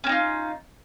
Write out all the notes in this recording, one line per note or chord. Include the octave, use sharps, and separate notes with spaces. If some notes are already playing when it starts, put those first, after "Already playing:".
C4 C#4 D#4 F4